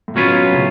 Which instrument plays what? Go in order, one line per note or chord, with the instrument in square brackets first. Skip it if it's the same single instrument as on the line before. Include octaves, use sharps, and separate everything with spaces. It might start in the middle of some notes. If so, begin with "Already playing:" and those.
[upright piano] A2
[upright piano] B2 [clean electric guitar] F#3 C#4 F4 B4
[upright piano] A2 C#3